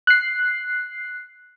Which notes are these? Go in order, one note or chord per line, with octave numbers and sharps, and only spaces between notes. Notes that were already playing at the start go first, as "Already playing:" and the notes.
F#6 C7